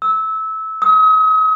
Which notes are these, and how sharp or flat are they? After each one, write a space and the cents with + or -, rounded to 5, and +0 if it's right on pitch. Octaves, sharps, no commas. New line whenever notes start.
E6 -20
D#6 +40